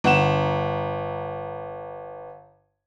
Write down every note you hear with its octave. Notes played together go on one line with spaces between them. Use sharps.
G1 F#5 E7